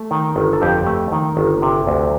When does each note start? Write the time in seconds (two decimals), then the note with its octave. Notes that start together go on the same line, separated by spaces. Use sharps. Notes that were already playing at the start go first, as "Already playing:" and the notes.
Already playing: A3
0.11 D#3
0.36 G1
0.53 A4
0.62 F2 G4
0.86 A3
1.12 D#3
1.37 G1
1.62 C3
1.87 D2